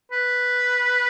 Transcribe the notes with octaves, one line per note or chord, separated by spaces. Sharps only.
B4